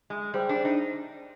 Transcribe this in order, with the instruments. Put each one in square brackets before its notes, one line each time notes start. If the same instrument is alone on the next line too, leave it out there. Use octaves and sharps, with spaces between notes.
[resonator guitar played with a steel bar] G#3
[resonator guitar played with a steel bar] G3 [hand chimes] G#4 C5 G5
[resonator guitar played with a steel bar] D4
D#4